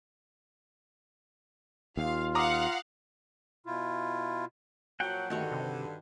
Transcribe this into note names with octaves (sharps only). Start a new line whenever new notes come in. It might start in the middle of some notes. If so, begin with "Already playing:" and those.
D#2 F4 F5
F5 F#5 A#5 D6 D#6
B2 E4 F4
A#2 F3 F#3 F#5 G5
G2 D3 D#3 A3 F#4 C#5
C3